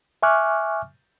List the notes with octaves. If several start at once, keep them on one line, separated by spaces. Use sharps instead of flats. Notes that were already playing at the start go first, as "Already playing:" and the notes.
E5 G#5 C#6 D6 F6 F#6